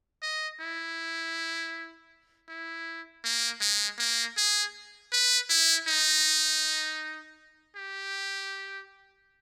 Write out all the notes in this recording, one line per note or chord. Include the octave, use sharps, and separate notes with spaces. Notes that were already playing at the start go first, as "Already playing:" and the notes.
D#5
E4
E4
A#3
G#3
A#3
G#4
B4
E4
D#4
G4